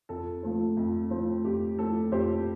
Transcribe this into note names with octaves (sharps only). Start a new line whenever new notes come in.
F2 A4
F3 A3 C4
F2
F3 A3 C4
F2 G4
F3 A3 C4 A4
F2 G4 C5